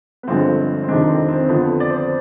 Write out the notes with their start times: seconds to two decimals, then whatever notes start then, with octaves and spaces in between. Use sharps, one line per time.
0.23 B3
0.27 G1 G2 D3 F3 G#3 C4
0.84 C4
0.88 F1 F2 C3 D#3 G#3 D4
1.09 C4
1.29 C4
1.48 F2 D3 F3 B3
1.80 D5
1.90 C5